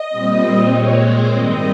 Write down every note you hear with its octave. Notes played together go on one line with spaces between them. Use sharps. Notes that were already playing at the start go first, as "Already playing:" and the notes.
Already playing: D#5
A#2 G3 C4
A#2 G#3 C4 C#5
C5
G#2 D#3 G3 C4 D#5